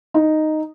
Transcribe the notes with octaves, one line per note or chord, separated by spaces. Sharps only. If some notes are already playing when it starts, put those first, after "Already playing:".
D#4